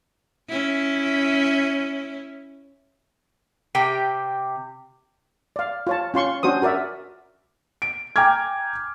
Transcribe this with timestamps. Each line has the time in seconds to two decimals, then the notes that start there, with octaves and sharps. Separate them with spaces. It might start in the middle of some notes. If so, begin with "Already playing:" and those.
0.49 C#4 E4
3.75 C3 G4 G5
5.56 D5 F5
5.87 F4 C#5 A5
6.14 C#4 F4 C6 C#6
6.43 C#4 D4 F#4 C5 D#6
6.62 F#4 A#4 D5 E5
7.82 D7
8.16 G5 G#5 A#5 D6 F6 G#6